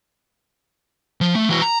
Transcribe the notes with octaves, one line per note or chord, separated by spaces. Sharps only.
F3
A3
E3 F#4
A#5